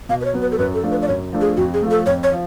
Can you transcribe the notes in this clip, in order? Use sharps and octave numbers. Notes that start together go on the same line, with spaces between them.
B2 F5
B4
C#5
F#3 B3
B4
A4
F#2 B4
A4
F3 A3 D4
B4
D5
F#2 C#5
F3 A3 D4
G#4
F2 F#4
G#4
F3 A3
A4
F2 C#5
C#5
F3